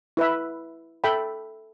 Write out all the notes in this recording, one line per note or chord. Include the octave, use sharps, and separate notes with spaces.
E4 B4 E5 B5
A4 E5 G5 B5